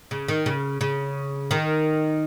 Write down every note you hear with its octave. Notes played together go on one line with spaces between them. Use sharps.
C#3
D#3
C#3
C#3
D#3